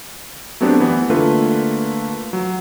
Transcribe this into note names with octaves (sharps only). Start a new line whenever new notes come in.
F#3 A3 B3 C4 D4 G4
E3 B3
D3 A3 A#3 F4 B4
F#3